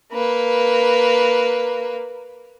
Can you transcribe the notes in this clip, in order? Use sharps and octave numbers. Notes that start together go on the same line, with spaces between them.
A#3 B4